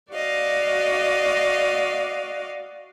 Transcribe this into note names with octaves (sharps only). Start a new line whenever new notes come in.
F#4 D5 D#5 F5